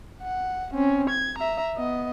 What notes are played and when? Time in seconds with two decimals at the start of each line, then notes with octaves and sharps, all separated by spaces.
0.23 F#5
0.74 C4 C#4
1.10 G#6
1.38 E5 A#5
1.77 B3 D#5